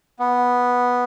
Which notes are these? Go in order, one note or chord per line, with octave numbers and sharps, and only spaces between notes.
B3